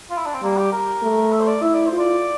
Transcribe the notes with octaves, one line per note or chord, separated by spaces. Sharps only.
F4
E4
D4
C4
G3 A#3
G4
A#4
A3
E5
C5
D5
E4 E5
D5
C5
F4
D5